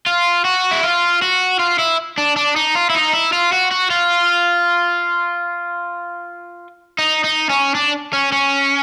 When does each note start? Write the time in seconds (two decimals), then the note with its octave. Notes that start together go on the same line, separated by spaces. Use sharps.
0.06 F4
0.45 F#4
0.71 E4
0.83 F4
1.22 F#4
1.60 F4
1.79 E4
2.18 D4
2.36 D4
2.56 D#4
2.75 F4
2.90 E4
2.95 D#4
3.13 E4
3.33 F4
3.53 F#4
3.71 F#4
3.90 F4
6.98 D#4
7.24 D#4
7.50 C#4
7.75 D4
8.13 C#4
8.32 C#4